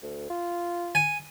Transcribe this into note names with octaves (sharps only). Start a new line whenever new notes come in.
D2
F4
G#5